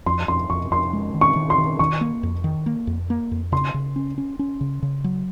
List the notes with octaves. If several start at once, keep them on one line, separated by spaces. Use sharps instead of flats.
F2 C6
F2 C6
F2 C#6
F2 C6
G#3
D#3
C#6
D#3
C6
D#3
D#3 C#6
A#3
F2
D#3
A#3
F2
A#3
F2
C#3 C6
C#3
C#4
C#4
C#4
C#3
C#3
F#3